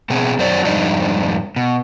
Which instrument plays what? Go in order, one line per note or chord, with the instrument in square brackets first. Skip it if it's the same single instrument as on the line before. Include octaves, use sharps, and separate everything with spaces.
[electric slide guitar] B2 B3 C4 G#4
F#2 F#3 C5 D5
F2 G#2 G3 D4 D#4
B2